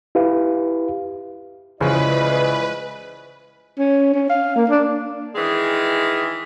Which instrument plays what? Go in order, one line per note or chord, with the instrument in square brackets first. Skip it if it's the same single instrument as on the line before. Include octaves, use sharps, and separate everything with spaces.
[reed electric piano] E4 G4 B4 F5
[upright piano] A1 C#3 [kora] F3 G#3 [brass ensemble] E4 D5 D#5 [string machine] B4
[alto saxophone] C#4
C#4
F5
A#3
D4
[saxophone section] D#3 E3 G#3 G#4